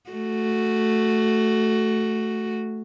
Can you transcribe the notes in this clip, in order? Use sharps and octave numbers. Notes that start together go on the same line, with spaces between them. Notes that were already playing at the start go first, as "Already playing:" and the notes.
A3 F#4